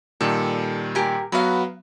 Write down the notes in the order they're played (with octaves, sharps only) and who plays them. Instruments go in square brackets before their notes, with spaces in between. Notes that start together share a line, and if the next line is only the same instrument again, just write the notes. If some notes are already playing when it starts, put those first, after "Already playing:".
[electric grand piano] A#2 D#3 G3 [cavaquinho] A4
[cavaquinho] G4 A#4 G#5
[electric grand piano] F#3 B3 F#4 [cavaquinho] B4 F5